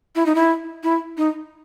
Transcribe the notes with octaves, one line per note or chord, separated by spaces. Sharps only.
E4
D#4
E4
E4
D#4